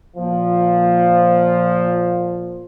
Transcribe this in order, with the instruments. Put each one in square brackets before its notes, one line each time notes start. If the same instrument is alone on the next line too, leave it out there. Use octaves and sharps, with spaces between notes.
[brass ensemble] A#2 F3